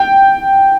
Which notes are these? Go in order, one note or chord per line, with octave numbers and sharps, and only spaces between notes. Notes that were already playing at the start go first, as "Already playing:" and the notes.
Already playing: G5